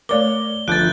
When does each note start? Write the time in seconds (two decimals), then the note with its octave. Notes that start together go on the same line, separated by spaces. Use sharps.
0.09 A3 A#4 C#5 D5 D6 G7
0.68 G1 F3 F#6 G6 A6 D7